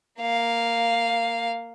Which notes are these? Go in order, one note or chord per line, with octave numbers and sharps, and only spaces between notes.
A#3 F5